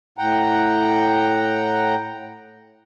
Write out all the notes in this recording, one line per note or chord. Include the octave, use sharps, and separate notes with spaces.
A2 F#5 G5 A#5